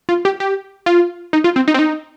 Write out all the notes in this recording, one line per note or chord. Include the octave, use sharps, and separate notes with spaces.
F4
G4
G4
F4
D#4
F4
C4
D#4
C4
D#4